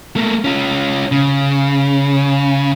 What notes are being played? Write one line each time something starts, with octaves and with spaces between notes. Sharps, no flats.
A3 A#3
C#4 F4
C#3